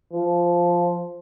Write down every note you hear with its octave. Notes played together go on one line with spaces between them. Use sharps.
F3